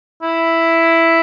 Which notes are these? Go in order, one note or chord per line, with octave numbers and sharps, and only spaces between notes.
E4